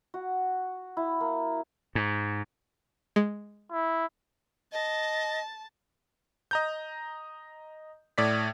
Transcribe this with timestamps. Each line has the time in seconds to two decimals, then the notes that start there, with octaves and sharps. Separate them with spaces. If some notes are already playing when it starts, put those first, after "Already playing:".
0.14 F#4
0.97 E4
1.21 A#3
1.95 G#2
3.16 G#3
3.72 E4
4.72 D#5 A5
6.51 D#5 A#5 G6
8.18 A2 D5 B6